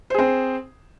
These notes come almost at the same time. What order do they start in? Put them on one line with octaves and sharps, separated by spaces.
C5 G#4 C4